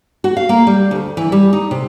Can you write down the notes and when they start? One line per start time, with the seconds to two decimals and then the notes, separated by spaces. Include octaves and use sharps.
0.24 F#4
0.37 F5
0.49 A#3
0.67 G3
0.91 D2
1.17 E3
1.32 G3
1.53 D#4
1.71 C3